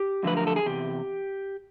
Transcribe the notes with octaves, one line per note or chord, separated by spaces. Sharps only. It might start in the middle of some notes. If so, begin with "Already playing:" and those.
Already playing: G4
F#2 D3 F3 A3 B4
A#4
A4
G#4
E2 C3 G4